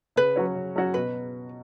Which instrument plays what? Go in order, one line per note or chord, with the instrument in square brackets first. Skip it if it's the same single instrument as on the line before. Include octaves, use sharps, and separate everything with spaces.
[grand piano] C#3 [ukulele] B4
[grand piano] F#3 C#4 F#4 C#5
C#3
F#3 C#4 F#4 C#5
[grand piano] B2 [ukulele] B4